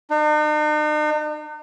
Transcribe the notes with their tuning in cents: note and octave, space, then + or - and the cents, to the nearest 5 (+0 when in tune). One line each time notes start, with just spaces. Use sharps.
D#4 -45